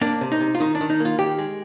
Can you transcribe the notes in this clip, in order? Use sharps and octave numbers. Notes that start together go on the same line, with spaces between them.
A#3 D4
C3
D#4
C3
F4
D#3 D#4
D4
D#3
D#4
A#3 F4
D#3 G4
G#3